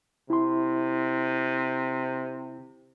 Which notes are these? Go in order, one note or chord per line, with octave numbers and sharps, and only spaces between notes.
C3 E4 C6